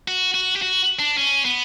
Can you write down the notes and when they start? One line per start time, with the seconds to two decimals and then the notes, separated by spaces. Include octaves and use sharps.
0.08 F#4
0.34 F#4
0.56 G4
0.62 F#4
0.99 D4
1.17 C#4
1.45 B3